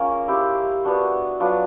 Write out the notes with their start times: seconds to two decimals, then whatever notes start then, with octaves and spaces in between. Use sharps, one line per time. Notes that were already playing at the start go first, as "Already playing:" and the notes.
Already playing: A#3 C#4 F4 G#4 A#4 C#5
0.28 E4 G4 C5
0.84 B3 D4 F#4
1.40 F#3 B3 D4 F4